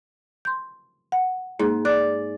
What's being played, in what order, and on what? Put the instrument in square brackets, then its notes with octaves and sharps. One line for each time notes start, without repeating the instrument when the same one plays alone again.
[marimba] C6 G6
F#5
[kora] G#2 [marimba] A#3
[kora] D5 [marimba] F#6